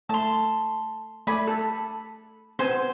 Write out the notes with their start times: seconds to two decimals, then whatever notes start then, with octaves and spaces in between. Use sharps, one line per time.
0.09 A3 A5 C6
1.27 A3 D5 G#5 B5
1.48 A4
2.59 B3 C4 C5 G#5